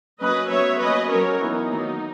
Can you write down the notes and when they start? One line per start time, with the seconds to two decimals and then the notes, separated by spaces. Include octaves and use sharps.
0.21 F#3 A#3 C#4 B4 D#5
0.50 F#3 B3 C#5 E5
0.80 F#3 A#3 C#4 B4 D#5
1.10 F#3 C#4 A#4 C#5
1.40 E3 B3 D#4
1.70 D#3 F#3 A#3